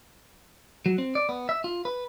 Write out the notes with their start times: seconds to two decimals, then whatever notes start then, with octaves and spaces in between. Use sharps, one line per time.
0.86 F#3
0.98 C4
1.15 D5
1.29 B3
1.49 E5
1.64 F4
1.85 B4